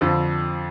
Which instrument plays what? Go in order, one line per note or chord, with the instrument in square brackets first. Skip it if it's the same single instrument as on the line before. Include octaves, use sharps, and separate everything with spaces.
[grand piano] F2 D3 F3